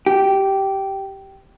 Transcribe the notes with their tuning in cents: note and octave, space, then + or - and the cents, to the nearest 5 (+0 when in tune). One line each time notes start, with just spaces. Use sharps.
G4 -10